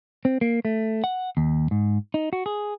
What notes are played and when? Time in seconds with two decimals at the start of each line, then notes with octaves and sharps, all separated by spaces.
0.25 C4
0.41 A#3
0.65 A3
1.04 F#5
1.37 D#2
1.71 G#2
2.14 D#4
2.33 F#4
2.46 G#4